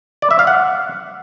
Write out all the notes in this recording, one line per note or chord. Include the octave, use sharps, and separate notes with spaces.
D5
E5
F5
F#5